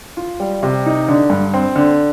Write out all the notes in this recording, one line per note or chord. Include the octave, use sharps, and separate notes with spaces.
F4
G3
C3
D#4
D3
G2
C4
D3